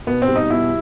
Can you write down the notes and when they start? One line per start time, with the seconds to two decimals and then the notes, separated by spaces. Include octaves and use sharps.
0.07 B2 B3
0.22 C4
0.28 G3
0.36 D#4
0.50 B2 E4